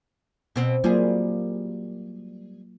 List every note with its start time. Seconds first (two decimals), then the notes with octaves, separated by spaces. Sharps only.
0.56 B2 C4
0.84 F#3 G3 A#3 F4 G#4